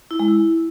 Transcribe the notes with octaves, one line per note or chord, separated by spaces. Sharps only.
E4
G#3
E4